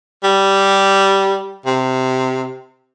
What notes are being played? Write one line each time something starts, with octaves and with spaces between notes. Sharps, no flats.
G3
C3